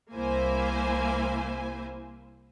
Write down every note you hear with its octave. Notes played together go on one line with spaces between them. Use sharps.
C2 A#3 E4 C5 G#5